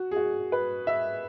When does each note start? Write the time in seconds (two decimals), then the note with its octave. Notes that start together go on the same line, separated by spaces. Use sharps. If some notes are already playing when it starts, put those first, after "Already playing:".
Already playing: F#4
0.11 G#4
0.17 F#4
0.52 B4
0.87 E5